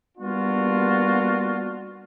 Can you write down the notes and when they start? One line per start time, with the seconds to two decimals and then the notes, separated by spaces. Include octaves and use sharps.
0.18 G3 A#3 B3 D4 F4 F#4